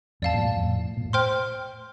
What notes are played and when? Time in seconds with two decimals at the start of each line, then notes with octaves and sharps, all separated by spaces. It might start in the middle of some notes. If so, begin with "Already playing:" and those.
0.22 F2 A2 D5 F5 A5
0.34 G2 A#2
0.45 G2 A#2
0.56 F2 A2
0.97 A#2
1.05 A2
1.13 C5 G5 C6 F6